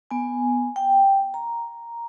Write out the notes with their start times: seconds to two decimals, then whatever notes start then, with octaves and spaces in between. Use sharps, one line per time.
0.11 B3 G#5
0.76 G5
1.34 A#5